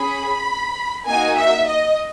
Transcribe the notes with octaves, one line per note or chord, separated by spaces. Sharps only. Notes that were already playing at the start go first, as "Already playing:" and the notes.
Already playing: C#4 G#4 B5
A#3 D#4 F#4 G#5
E5
D#5